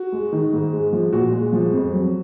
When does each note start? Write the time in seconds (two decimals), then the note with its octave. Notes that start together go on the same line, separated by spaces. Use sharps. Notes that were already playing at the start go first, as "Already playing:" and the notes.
Already playing: F#4
0.12 G#3
0.32 D#3
0.53 G#2
0.73 G#3
0.93 F3
1.13 A#2 F#4
1.33 G#3
1.52 F3
1.73 F2
1.93 F#3